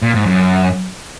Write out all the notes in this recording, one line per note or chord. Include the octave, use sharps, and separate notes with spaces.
A#2
G#2
F#2